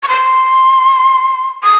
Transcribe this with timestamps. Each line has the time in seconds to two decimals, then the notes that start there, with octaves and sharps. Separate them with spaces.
0.03 C#6
0.08 C6
1.63 D#6